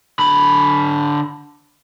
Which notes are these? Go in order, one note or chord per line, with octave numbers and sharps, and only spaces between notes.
D3 B5